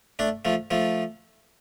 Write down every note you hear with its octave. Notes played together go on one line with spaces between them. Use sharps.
A3 D4
F3 A3
F3 A3